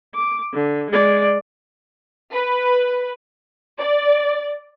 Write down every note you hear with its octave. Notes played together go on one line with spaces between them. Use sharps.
D6
D3
G#3 D5
B4
D5